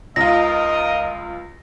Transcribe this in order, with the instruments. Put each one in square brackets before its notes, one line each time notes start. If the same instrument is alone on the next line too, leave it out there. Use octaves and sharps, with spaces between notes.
[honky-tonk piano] C#2 F4 [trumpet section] D#4 A#4 D#5 [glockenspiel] A#6